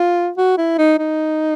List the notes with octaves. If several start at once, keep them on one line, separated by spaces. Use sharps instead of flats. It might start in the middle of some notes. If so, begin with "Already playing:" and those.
Already playing: F4
F#4
E4
D#4
D#4